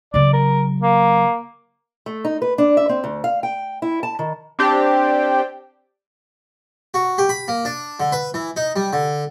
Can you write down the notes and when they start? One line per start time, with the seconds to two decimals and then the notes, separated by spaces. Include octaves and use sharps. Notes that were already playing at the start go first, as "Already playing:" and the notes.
0.14 C#3 F#3 D5
0.33 A#4
0.81 A#3
2.06 A3
2.25 D#4
2.42 B4
2.58 D4
2.77 E5
2.89 C4
3.04 D2
3.24 F5
3.43 G5
3.82 E4
4.03 A5
4.19 D#3
4.59 C4 D4 G4
6.94 F#4
7.18 G4
7.29 B5
7.48 A#3
7.65 D4
8.00 D3
8.12 B4
8.34 E3
8.57 D#4
8.76 G3
8.93 D3